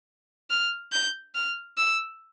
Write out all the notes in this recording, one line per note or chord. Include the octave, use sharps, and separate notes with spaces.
F6
G6
F6
E6